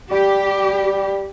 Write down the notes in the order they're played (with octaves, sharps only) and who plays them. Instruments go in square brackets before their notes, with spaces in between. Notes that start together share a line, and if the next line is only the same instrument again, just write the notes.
[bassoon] G3 [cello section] G4